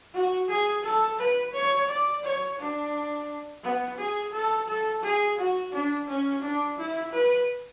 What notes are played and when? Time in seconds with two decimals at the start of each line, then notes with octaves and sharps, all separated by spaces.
0.14 F#4
0.49 G#4
0.84 A4
1.19 B4
1.54 C#5
1.89 D5
2.24 C#5
2.59 D4
3.64 B3
3.98 G#4
4.33 A4
4.68 A4
5.03 G#4
5.38 F#4
5.73 D4
6.08 C#4
6.42 D4
6.78 E4
7.13 B4